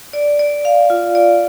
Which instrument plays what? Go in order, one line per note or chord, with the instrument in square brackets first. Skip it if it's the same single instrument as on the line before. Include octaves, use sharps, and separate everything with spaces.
[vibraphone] D5
D5
F5
F4
D5